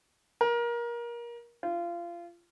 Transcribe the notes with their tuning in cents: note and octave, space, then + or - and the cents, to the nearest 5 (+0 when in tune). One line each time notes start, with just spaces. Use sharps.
A#4 +25
F4 -25